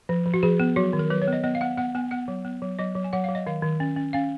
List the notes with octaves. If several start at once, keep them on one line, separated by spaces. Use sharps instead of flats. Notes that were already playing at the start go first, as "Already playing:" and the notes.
F3
F3
F#4
F3 G#4
B3
F#3 F#4
D#3
A#4
F#3 B4
C#5
B3 D#5
B3 D#5
F5
B3 F#5
B3 F#5
B3 G#5
B3 F#5
F#3
B3
F#3
F#3 D#5
F#3
G#5
F#3 F#5
F5
F#3
D#5
D#3 F5
D#3
C#4
C#4
C#4 F5